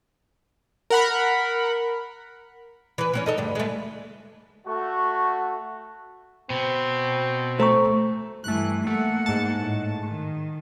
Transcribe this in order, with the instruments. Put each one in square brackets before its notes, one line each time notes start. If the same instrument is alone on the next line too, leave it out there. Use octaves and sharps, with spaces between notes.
[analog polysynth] A#4 F#5 B5
[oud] E3 B4
E3 C4 C#4
D#4 A4 D#5
D2 G2 G3
G#3 A3
[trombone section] A3 F#4
[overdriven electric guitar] B2 [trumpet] C4
[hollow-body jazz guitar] A3 [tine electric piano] C5 A#5 C#6
[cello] G2 E3 [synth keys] A3 F#6
[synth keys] A3 [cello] A#3 F#5
[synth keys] G#2 A5
[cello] A2
D#3